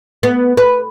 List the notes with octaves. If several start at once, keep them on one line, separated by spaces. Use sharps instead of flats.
B3
B4